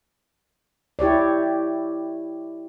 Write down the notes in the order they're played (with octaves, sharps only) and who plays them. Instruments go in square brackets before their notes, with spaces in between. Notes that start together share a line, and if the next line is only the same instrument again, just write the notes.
[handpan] E4 G4 C#5 D5